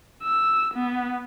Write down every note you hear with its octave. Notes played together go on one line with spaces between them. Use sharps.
E6
B3